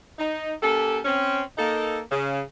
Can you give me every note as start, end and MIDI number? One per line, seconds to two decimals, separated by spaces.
0.18 0.53 63
0.62 0.99 58
0.62 0.99 61
0.62 0.99 67
0.62 0.99 69
1.05 1.42 60
1.05 1.42 61
1.58 1.98 58
1.58 1.98 63
1.58 1.98 69
2.11 2.40 49